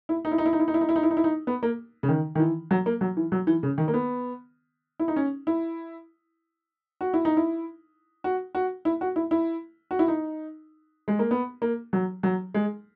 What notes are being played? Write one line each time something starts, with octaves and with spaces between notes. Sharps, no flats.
E4
D#4
E4
D#4
E4
D#4
E4
D#4
E4
D#4
E4
D#4
E4
D#4
E4
D#4
B3
A#3
C#3
D#3
D#3
E3
F#3
A#3
F#3
E3
F#3
E3
C#3
D#3
A#3
B3
E4
D#4
C#4
E4
F#4
E4
D#4
E4
F#4
F#4
E4
F#4
E4
E4
F#4
E4
D#4
G#3
A#3
B3
A#3
F#3
F#3
G#3